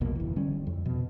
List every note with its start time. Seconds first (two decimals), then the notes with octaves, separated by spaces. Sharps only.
0.01 B1 F2 B2 A#3
0.15 G1 E3
0.36 D3 G3 C#4
0.67 F2
0.86 B2